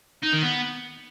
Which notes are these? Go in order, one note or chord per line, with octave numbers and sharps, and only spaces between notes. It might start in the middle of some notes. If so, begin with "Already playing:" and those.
D#4
D#3
B3